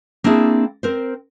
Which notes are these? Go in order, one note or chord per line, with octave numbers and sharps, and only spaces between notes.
A#3 C4 D4 E4 G#4
C4 A#4 C5